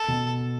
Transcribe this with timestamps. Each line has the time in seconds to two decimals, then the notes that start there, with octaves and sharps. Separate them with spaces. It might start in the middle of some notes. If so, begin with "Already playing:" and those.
Already playing: A4
0.08 B2